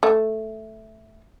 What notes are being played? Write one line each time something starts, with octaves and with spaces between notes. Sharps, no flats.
A3